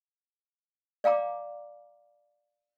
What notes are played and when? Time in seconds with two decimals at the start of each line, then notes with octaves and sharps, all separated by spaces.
1.04 D5 F5 G5 A#5 D6